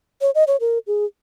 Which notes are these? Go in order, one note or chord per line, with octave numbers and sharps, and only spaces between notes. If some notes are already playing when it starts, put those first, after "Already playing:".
C#5
D#5
C#5
A#4
G#4